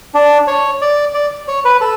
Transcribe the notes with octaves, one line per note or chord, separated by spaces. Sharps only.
D4
C#5
D5
D5
C#5
B4
A4